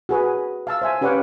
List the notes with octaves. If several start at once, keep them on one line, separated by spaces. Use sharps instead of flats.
F#4 G#4 B4
F5 A5 E6
C5 E5 G#5
C#4 G4 B4 C#5 F5 F#5